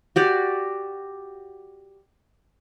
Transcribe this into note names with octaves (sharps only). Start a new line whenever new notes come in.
F#4 G4 D5